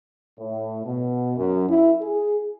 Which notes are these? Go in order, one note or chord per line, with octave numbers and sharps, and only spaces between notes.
A2
B2
F#2
E4
G#4